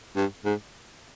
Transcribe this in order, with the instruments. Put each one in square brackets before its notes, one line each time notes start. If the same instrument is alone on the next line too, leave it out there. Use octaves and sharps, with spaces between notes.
[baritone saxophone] G2
G#2